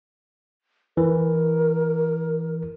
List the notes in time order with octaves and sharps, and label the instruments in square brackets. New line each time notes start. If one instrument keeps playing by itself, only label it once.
[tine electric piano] E3 [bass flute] A#4